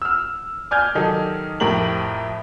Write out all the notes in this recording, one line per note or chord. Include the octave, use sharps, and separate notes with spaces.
E6 F6
D5 G#5 F6 G6 G#6
D#3 F#3 D#4 G4 A4
F2 A2 G4 A#4 F#7